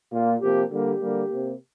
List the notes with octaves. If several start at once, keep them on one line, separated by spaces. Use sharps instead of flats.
A#2 A#3 F4
C3 F3 A#3 G4
D3 G3 A#3 G4
D3 G3 A#3
C3 A#3